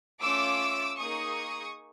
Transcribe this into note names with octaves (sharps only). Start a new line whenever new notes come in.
A3 C#4 F4 D6 E6
A#3 D#4 G#4 C#6 D#6